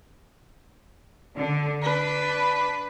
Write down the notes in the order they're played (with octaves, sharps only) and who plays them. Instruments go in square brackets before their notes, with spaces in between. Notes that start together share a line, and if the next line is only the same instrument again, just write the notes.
[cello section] D3
[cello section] D4 [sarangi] B4